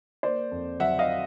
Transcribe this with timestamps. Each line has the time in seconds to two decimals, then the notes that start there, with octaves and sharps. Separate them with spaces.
0.23 A#3 C5 D5
0.51 F2
0.80 F#3 E5 F#5
0.99 D#5 F5